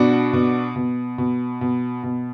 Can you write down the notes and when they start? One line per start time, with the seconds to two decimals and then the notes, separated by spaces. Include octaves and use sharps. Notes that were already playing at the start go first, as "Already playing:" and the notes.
Already playing: B2 D4 F#4
0.33 B2
0.76 B2
1.18 B2
1.61 B2
2.03 B2